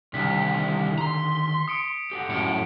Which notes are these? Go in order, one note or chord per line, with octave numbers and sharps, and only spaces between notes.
C2 D3 D#3 G4 B6
A#5 C6
D#6 C#7 D7
G4 A4 F#5
F#2 A2 C#7 D7